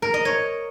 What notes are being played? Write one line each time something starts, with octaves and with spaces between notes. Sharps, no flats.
A#4
D#5
C#5